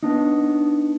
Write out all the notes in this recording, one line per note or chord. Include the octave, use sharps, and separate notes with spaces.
B3 D4 D#4